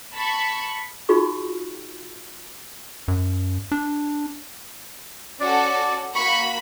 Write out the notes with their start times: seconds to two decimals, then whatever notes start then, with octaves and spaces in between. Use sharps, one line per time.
0.14 A5 B5 C#6 B6
1.09 D#4 F4 F#4 G#4 C#6
3.08 F#2
3.72 D4
5.41 C#4 F#4 A4 D5
6.16 A#3 F#4 B5 C#6